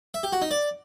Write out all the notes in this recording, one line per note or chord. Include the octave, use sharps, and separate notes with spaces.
E5
G4
F#4
D#4
D5